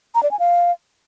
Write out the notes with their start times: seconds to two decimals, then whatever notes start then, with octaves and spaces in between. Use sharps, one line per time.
0.15 A#5
0.23 D5
0.31 G#5
0.39 F5